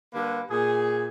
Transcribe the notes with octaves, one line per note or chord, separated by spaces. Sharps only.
D3 G3 A#3 B4
A#2 G#4